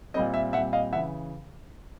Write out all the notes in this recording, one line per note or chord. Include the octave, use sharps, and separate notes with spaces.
A#2 G3 C4 D#5
E5
A#2 G3 C4 E5 F#5
D#5 F5
C#3 E3 E5 F#5